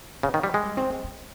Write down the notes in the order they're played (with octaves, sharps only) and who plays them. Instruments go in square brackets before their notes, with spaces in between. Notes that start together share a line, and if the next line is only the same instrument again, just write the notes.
[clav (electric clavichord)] C#3 [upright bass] A#3
[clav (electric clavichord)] D#3
G3
G#3
[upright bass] G3
C4
G#3
G#3